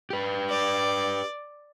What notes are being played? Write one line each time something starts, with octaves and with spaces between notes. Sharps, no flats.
G4 B4
D5